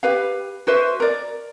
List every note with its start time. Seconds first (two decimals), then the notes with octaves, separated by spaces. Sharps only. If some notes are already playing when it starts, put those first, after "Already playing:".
0.03 G4 B4 F5
0.67 F#4 B4 C5 E5
1.00 A#4 D5